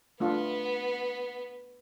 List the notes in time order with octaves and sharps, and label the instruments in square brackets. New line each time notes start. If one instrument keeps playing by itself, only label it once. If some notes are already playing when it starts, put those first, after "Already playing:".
[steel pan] A3 D4 F4 [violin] B3